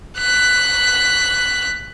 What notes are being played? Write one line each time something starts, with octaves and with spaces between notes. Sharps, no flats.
F#6 B6